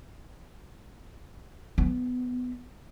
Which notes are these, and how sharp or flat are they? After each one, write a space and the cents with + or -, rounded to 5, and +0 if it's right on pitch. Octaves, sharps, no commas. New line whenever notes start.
B3 +15